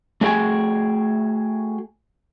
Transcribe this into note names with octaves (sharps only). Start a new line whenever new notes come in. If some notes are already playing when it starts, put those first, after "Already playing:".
A3 D4 F#4 G#4 G5 G#5